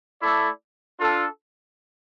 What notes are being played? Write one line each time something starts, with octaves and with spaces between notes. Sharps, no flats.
A3 E4 A4 D5
D4 F4 A4